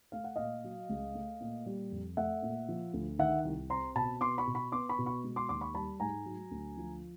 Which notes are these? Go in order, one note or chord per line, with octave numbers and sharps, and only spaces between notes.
A3 F5
F#5
A#2 D#5 F5
F#3
C#2
A3
A#2
G3
F2
A3 E5 F#5
A#2
F3
D2
D#3 E5 F#5
C2
C4 A#5 C6
B2 A5 B5
B3 C6 D6
B5 C#6
B2
B5 C#6
B3 C6 D6
B5 C#6
B2
B5 C#6
G#3
C6 D6
D#2 C6 D6
B5 C#6
G3 A5 B5
G#2 G#5 A#5
F#3
D2
F3